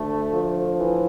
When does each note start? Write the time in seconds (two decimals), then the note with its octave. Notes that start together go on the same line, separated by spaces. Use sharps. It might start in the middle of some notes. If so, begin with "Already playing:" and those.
Already playing: D2 A3
0.33 F3
0.77 E3